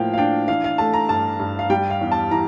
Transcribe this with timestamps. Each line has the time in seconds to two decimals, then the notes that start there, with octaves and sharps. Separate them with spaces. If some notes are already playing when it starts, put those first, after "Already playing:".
Already playing: A2 F3 A#3 F5 G5
0.13 F5
0.18 D4 G5
0.48 E3 F5
0.64 F5
0.78 A3 A5
0.94 A#5
1.09 G2 A5
1.40 G2
1.59 F5
1.70 G3 G5
1.90 F5
2.01 E2
2.12 A5
2.31 E3 A#5